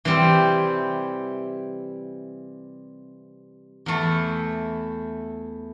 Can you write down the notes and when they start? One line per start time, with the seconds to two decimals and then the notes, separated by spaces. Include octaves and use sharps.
0.05 C3 E3 G3 C4 E4
3.86 E2 E3 A3 E4